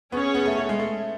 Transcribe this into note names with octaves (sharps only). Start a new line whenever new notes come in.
B3 C#4 G#4 C#5
B3
A3
A3
G#3
A3